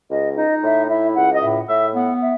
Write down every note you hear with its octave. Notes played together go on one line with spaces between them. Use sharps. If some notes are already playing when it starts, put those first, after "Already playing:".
C#2 D#5
D#4 D#5
A2 E5
E4 E5
C#2 F#5
D#5
A2 E5
A2 E5
B3 F#5
E5